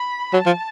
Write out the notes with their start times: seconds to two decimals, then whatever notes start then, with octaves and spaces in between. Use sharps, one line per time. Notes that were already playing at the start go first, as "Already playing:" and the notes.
Already playing: B5
0.33 F#3 A5
0.46 F3